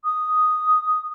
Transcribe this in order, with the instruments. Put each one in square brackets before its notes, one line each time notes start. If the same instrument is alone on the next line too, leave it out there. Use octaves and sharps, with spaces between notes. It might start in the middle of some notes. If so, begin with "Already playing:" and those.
[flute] D#6